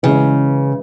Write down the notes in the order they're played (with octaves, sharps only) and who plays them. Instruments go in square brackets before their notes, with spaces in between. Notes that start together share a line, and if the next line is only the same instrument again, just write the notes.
[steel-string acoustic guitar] C#3 [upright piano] E3 G#3 C#4